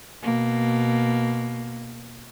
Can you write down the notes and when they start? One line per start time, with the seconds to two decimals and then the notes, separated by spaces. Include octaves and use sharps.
0.22 B2 A#3